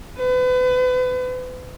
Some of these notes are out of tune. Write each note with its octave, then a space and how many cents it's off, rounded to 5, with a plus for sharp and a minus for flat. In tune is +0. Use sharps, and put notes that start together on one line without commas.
B4 +35